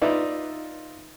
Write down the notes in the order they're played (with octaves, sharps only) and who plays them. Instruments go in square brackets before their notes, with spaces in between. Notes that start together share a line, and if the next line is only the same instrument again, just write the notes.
[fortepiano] D#4 F4 B4 D5 E5